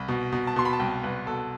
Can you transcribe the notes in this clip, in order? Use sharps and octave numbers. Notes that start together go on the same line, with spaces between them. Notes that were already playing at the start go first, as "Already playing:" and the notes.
Already playing: C2 B5
B2
B2
A5
B2 C6
B5
A5
C2 G5
C2 B4
B2 A4